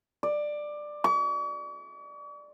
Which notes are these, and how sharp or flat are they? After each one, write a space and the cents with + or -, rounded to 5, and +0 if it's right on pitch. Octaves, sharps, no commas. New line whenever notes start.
D5 +15
C#6 +45